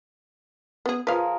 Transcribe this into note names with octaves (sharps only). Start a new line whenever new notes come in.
B3 G#4
F3 G#4 A#4 B4 F5